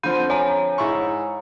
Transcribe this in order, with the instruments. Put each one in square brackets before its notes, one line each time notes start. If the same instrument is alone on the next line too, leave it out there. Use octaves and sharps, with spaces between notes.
[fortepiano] D3 F3 C4 [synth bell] B5 G6 D#7
[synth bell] C#5 G#5 A#5
[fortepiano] G#2 E4 C#6